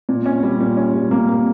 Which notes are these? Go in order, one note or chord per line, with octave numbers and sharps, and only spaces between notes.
A#2
C#4
G3
A#2
C#4
G3
A#3
A#3